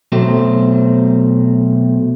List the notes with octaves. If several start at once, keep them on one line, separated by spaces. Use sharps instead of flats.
B2 F#3 A3 C4